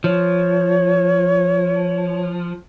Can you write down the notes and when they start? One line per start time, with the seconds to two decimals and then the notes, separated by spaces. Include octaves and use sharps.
0.04 F3 C#5